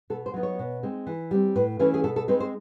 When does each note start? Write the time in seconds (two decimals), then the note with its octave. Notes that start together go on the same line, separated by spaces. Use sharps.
0.10 B2 A4
0.26 C5
0.34 F#3 B3 D#4
0.43 C#5
0.59 B2
0.83 G#3 C4 D#4
1.07 E3
1.31 G3 C4
1.56 A2 B4
1.79 E3 A3 C#4 B4
1.94 G#4
2.04 B2 A4
2.16 A4
2.28 G#3 C4 D#4 B4
2.40 C5